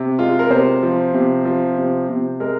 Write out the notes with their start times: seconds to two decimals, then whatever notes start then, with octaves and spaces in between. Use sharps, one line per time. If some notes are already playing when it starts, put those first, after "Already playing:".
Already playing: C3
0.19 G#3 F4
0.39 A#4
0.50 C3 C5
0.83 F3
1.14 C3
1.45 F3
1.78 C3
2.10 C3
2.40 G#3 A#4